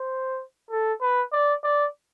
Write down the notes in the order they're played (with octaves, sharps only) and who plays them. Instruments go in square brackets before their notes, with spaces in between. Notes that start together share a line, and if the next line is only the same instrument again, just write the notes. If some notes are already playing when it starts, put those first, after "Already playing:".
Already playing: [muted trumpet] C5
A4
B4
D5
D5